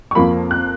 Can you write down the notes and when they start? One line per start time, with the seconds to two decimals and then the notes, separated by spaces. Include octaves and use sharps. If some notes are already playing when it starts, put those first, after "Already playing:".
0.11 C#6
0.15 F2 F3 A#3 B5
0.51 F#6